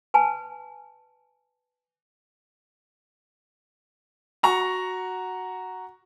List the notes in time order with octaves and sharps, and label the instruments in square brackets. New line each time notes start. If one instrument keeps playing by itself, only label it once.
[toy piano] B4 G#5 A5
[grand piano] F#4 A#5 C#6